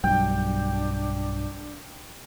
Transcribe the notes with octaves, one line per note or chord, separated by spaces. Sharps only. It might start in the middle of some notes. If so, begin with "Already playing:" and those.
B1 G2 F#3 D4 G5